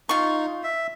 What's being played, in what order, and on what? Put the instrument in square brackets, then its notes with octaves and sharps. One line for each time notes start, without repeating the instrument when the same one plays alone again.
[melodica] D#4 [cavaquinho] F4 C#6
[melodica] E5